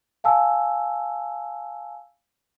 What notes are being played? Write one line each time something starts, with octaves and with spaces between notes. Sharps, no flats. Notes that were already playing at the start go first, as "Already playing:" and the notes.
F5 G#5 A5 E6